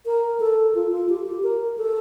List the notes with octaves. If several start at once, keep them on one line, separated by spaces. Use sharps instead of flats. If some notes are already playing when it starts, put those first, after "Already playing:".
A#4
A4
F4
F4
G4
G4
A#4
A4